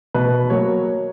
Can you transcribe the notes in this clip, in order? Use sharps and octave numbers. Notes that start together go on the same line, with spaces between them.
B2 B4
F#3 A#3 C#5